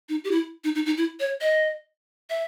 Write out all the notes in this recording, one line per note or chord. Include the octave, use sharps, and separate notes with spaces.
D#4
G4
E4
D#4
D#4
D#4
E4
C#5
D#5
E5